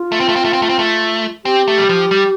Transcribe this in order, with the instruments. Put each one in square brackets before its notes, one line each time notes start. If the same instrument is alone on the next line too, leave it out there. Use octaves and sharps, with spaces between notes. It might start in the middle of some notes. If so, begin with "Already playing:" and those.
Already playing: [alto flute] F4
[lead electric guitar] A3
C4
A3
C4
A3
C4
A3
C4
A3
[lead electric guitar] C4 [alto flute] G4
[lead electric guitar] A3
G3
F3
G3